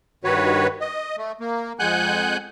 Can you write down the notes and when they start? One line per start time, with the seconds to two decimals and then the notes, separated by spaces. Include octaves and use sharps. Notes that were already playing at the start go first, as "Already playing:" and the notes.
0.24 G2 D#3 F#4 B4 C#5
0.81 D#5
1.18 A3
1.40 A#3
1.79 F2 G#3 F#5 G#5 F#6 G6